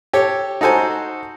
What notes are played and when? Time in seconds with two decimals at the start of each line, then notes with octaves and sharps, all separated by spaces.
0.13 G4 A4 C#5
0.61 D#4 F#4 A4 C5 G#5